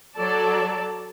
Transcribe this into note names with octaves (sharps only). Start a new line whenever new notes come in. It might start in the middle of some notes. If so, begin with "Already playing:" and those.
F#3 A4 D5 A5